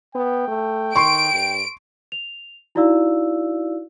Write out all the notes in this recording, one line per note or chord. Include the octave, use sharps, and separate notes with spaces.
B3 G5
A3
D#3 C6 C#6 D7
G2
F7
D#4 E4 F#4 D5 F5 E6